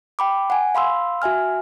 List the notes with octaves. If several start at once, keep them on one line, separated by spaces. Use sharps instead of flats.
G5 B5 D6
F#5 G#5
F5 B5 C6 E6
F#4 E5 G#5 F6